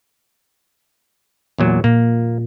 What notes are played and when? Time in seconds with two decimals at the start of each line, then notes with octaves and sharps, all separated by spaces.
1.58 E2 A#2 F#3
1.84 A#2 A#3